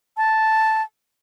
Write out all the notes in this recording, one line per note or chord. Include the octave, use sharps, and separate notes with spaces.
A5